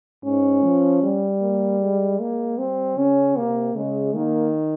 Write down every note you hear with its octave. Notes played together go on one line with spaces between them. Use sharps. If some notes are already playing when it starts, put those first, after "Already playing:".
G#2 C#4
F3
G3
A#3
G#3
G#3 A#3
G3 C4
C#3 C#4
C3 A#3
C#3 G#3
D#3 A#3